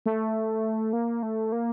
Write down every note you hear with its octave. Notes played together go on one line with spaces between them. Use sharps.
A3
A#3
A3
A#3